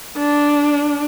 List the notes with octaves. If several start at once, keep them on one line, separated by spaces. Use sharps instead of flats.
D4